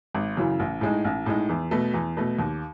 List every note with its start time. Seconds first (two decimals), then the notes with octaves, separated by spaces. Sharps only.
0.15 G#1
0.37 F#2 C#3 E3
0.60 A1
0.81 A2 G#3 D#4
1.05 A1
1.26 A2 G#3 D#4
1.49 E2
1.71 B2 A3
1.94 E2
2.17 B2 A3
2.39 D#2